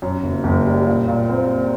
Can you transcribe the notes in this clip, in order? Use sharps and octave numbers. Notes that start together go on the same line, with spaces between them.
F#2
F#1
F#1
G3
A#2
A#2
C4